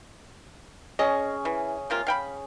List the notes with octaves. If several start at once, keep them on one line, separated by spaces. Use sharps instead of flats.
C#4 G#4 D#5
E3
C3 A#3 F4
F5 G5 B5